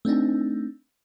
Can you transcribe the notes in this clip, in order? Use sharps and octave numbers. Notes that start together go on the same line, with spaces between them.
A3 C4 D4 D#4